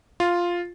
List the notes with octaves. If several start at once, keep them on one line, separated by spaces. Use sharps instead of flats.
F4